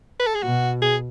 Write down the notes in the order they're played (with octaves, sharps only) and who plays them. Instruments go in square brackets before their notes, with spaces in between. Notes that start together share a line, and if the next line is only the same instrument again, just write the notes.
[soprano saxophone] B4
A4
G#4
[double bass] B2 [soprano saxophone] F#4
[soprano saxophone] G#4